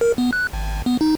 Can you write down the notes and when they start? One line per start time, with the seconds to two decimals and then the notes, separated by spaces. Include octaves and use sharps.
0.01 A#4
0.18 B3
0.33 F#6
0.53 G#1
0.86 B3
1.01 D#4